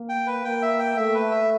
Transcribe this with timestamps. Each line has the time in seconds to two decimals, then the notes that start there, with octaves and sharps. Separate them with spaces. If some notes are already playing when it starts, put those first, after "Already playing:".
Already playing: A#3
0.09 G5
0.27 B4
0.44 A#3 G5
0.62 E5
0.79 G5
0.97 A3 E5
1.15 B4
1.31 E5